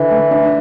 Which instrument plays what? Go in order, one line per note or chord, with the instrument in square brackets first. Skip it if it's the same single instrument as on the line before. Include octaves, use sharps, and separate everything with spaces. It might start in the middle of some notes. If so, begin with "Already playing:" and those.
Already playing: [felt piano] D3 E4 A4 [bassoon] E3
[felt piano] A3
D4